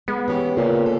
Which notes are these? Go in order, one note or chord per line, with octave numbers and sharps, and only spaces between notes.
G#3 B3
E3 C#4 G4
A#2 C#3 C#4
A4